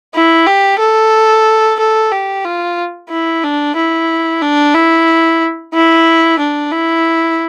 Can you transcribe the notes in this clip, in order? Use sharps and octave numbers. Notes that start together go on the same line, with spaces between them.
E4
G4
A4
A4
G4
F4
E4
D4
E4
D4
E4
E4
D4
E4